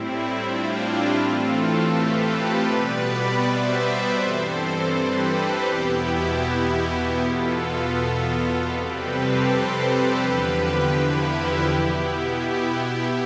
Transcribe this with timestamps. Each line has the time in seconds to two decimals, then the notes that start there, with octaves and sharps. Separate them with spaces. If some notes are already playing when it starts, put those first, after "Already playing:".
Already playing: A2 G3 C4 E4
0.40 D4 F4
0.78 E4 G4
1.15 A2 E3 A3 C4 F4 A4
1.91 G4 B4
2.66 B2 G3 B3 B4 D5
3.40 C5 E5
4.15 G2 E3 G3 C4 A4 C5
4.91 G4 B4
5.65 E2 B2 B3 E4 G4
7.16 E2 B2 B3 F4 A4
8.66 F2 C3 G3 C4 G4 B4
9.03 A4 C5
9.41 A4 C5
9.78 A4 C5
10.16 E2 D3 F3 G4 B4
10.91 E4 G4
11.66 B2 B3 E4 G4
12.03 E4
12.41 E4 G4